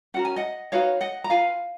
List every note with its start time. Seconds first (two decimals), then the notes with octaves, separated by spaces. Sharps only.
0.14 C#4 F#4 A#4 F#5
0.25 G#5
0.36 D#5 F#5
0.72 D#4 F#4 B4 C#5 F5
1.01 D#5 F#5
1.24 A#5
1.30 F4 B4 F5 G#5